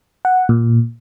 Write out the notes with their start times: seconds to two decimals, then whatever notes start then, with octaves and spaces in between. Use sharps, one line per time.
0.25 F#5
0.49 A#2